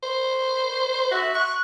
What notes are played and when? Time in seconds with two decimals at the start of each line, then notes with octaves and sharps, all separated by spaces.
0.03 C5
1.11 F#4 E5
1.35 C#6 F#6